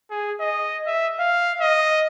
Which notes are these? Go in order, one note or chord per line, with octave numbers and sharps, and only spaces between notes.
G#4
D#5
E5
F5
D#5